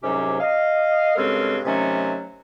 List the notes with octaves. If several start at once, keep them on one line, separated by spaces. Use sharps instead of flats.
C2 G#2 C3 F#3 C#4 G4
D#5 F5
G2 C#3 G#3 C4 A4 A#4
C3 D#3 F#3 A3 C#4